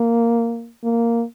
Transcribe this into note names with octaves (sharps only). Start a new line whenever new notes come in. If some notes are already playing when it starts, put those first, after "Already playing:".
Already playing: A#3
A#3